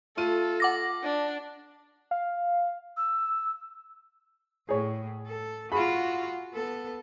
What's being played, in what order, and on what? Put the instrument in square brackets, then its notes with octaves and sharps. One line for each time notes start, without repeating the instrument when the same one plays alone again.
[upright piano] A3 F4 D#7 [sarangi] A4
[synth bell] F#5 D6 A#6
[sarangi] D4
[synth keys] F5
[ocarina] E6
[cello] A2 [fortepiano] G#4 C#5
[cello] A4
[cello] F4 F#4 [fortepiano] G#4 B5
[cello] B3 A4